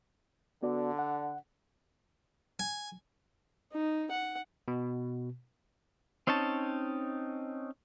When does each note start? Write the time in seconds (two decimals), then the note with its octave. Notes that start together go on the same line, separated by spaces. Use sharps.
0.63 D3 B3 F#4 D5
0.99 F#5
2.59 G#5
3.73 D#4
4.11 F#5
4.68 B2
6.27 C4 C#4 D#4 C#5 A5